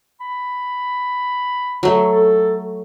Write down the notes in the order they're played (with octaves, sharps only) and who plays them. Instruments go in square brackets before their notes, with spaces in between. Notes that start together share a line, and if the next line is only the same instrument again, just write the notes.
[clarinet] B5
[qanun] F#3 A3
[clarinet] A4